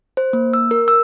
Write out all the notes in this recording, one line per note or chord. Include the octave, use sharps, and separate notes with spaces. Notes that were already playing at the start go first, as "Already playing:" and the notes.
C5
A#3
E6
A#4
E6